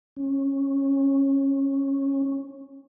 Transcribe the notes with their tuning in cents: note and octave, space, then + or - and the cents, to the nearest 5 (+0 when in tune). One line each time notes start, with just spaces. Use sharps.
C#4 -15